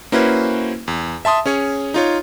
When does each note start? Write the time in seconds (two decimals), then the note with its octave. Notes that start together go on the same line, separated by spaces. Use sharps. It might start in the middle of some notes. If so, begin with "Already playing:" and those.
0.12 A#3 C#4 E4 F#4 B4 C5
0.88 E2
1.25 E5 A5 C6 D#6
1.46 C#4 G#4 C#5
1.94 D#4 F4 C#5